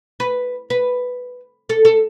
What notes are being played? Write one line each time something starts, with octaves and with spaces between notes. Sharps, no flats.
B4
B4
A4
A4